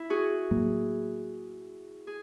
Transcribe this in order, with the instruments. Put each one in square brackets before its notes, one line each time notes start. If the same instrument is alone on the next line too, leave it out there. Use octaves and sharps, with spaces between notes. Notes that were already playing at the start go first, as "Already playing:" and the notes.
Already playing: [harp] E4
F#4 G#4
[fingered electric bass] A2 F#3 A#3
[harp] G#4